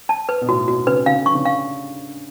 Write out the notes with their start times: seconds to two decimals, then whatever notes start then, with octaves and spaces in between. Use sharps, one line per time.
0.09 A5
0.29 B4
0.41 B2
0.49 A2 F#4
0.68 B2 F#4
0.87 C#3 B4
1.06 C#3 F5
1.21 D3
1.26 C#6
1.35 C#3
1.45 F5